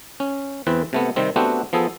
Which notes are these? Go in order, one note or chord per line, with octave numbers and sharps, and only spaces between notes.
C#4
E2 E3 C4 B4
C3 A3 B3
C3 D#3 G3 C4
A3 B3 C4 D4 F#4 G4
F3 B3 G#4 A4